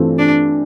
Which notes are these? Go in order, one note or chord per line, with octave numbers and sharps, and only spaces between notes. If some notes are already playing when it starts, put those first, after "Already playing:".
Already playing: G2 E3 A3 C4 F4
D4